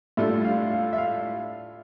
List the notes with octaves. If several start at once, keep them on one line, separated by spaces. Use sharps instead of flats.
A2 G3 D4 F4 A4 E5
F5
F5
E5
F5